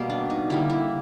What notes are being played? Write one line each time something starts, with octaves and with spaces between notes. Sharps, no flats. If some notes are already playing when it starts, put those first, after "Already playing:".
Already playing: B2 G3 A#3
D4
D#4
D3 G3 A#3 E4
E4